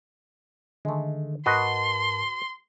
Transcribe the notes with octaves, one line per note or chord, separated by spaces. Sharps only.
D3 D#3 G#3 A3
G#2 F#4 A#4 B4 D#5 A5 C6